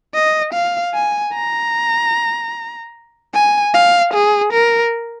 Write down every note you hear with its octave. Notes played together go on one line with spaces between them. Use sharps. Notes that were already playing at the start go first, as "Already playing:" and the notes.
D#5
F5
G#5
A#5
G#5
F5
G#4
A#4